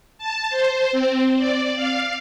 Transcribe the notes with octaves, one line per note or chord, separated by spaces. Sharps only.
A5
C5
C4
D5
F5